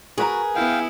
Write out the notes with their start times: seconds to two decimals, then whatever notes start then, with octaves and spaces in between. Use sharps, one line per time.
0.18 F#4 G#4 A#4 B4 A#5
0.55 B3 E4 F5 G5